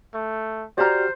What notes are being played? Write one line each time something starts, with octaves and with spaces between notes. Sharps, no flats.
A3
F#4 G4 C5 D5 A#5 F6